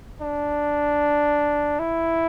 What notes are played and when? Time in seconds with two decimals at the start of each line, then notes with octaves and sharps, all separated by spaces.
0.21 D4
1.79 E4